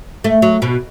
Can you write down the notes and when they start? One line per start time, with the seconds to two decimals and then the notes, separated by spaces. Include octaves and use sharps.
0.24 A3
0.42 F#3
0.62 B2